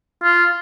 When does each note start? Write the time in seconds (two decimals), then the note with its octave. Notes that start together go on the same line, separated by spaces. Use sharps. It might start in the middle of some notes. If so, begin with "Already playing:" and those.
0.23 F4